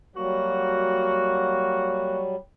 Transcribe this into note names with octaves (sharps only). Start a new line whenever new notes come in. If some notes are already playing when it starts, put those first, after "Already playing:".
F#3 G3 A#3 F#4